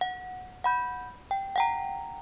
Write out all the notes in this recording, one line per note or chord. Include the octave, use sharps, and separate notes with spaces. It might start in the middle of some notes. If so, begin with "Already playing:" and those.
F#5
F#5 B5 G6
G5
F#5 G5 A#5